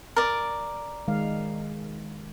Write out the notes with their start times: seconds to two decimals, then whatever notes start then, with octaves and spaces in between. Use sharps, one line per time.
0.16 A#4 D5
1.08 D#3 G#3 F5